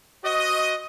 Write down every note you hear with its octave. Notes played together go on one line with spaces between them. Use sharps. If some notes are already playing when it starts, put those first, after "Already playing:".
F#4 C5 D#5